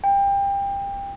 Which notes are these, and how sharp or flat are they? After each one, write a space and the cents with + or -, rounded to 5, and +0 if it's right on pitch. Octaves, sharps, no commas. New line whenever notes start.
G5 +25